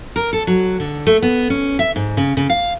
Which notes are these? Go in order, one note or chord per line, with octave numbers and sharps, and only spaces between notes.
A#4
A4
F#3
D3
A3
B3
C#4
E5
G#2
C#3
C#3
F5